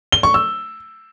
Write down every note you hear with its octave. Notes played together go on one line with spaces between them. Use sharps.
G7
C#6
E6